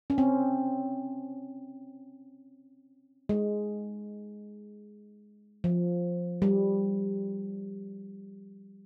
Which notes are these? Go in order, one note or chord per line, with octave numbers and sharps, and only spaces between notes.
C#4
C4
G#3
F3
G3